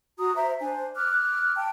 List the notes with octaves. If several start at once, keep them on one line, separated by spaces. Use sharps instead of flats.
F#4 A#5 D#6
C5 E5 A#5
D4 C5 G#5
D6 F6 F#6
G5 A5